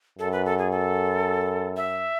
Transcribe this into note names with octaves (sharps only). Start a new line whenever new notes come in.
F#2 A4
B4
A4
G#4
A4
E5